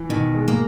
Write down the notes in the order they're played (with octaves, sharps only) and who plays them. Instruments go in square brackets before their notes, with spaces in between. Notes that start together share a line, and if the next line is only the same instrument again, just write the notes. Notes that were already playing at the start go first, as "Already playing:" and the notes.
Already playing: [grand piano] E3
[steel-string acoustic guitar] B2 [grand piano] D#3
[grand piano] G#3
[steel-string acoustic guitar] A#3